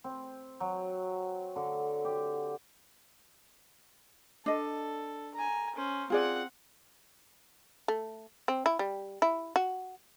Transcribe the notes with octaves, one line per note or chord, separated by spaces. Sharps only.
C4
F#3
D3
G4
D4 A4 D#5
G#5 A#5
C#4 C5
C4 F4 G#4 D5 F#5
A3
C4
E4
G3
E4
F#4